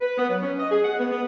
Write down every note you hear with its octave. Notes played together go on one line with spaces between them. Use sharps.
B4
B3
F#3
C#4
D#5
G#4
F#5
B3
B3